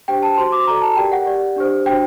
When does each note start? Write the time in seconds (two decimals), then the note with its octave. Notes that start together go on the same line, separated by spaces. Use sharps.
0.08 D4 G4 C5 G5
0.23 A5
0.38 F#4 C5 C6
0.52 D6
0.67 F#4 A4 D5 A#5
0.81 A5
0.96 G4 A#4 D5 G5
1.12 F#5
1.26 G4 D5
1.56 D4 G4 C5
1.86 D4 F#4 C5 G5